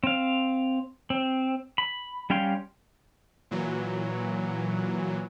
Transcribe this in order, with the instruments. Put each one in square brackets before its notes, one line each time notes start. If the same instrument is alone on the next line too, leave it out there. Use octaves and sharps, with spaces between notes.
[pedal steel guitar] C4 F5
C4
B5
G3 C#4 F5 G5 C6
[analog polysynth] A#2 E3 F#3